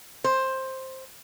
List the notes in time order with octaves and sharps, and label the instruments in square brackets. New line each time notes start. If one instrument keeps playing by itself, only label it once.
[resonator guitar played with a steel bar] C5